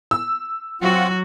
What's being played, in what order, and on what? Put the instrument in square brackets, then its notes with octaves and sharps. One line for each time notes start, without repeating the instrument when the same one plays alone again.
[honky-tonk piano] E6
[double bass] F#3 [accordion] C4 F4 F#5 [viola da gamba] F#4